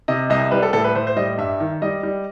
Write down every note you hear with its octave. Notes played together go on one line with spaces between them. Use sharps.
C3 D#5
C2 D#5
G3 B4
A4
A2 A4
B4
A2 C5
C5
G3 D#5
G2 E5
D#3
G3 D#5
G3